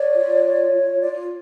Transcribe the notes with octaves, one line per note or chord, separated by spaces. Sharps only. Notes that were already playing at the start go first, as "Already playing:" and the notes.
Already playing: C#5 D5
F4
C#5
F4
F4 D5